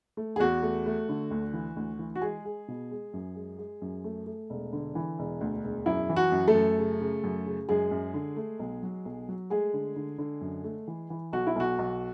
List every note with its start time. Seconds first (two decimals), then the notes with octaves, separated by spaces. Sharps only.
0.17 A3
0.36 G#4
0.40 E2 F#4
0.63 A3
0.86 A3
1.09 D3
1.31 D2
1.53 E3
1.77 D2
1.99 E3
2.15 F#4
2.22 G#3 G#4
2.45 G#3
2.68 B2
2.91 G#3
3.13 F#2
3.36 G#3
3.58 G#3
3.82 F#2
4.04 A3
4.27 A3
4.50 E1
4.73 D3
4.95 E3
5.19 E1
5.41 D2
5.64 E1
5.86 F#2 E4
6.09 E3
6.16 F#4
6.32 F#2
6.47 A3 A4
6.54 F#2
6.78 C#3
7.01 C#3
7.24 F#2
7.46 C#3
7.69 F#2 G#3 G#4
7.91 F#2
8.14 D3
8.37 A3
8.60 B1
8.83 F#3
9.05 B1
9.29 F#3
9.50 G#3 A3 G#4
9.74 D3
9.96 D3
10.19 D3
10.41 F#2
10.64 A3
10.88 E3
11.10 E3
11.33 B1 F#4
11.47 E4
11.56 B1 F#4
11.79 B1